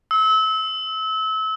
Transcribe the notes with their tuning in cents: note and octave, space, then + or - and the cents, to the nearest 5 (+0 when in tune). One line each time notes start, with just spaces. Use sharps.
E6 -30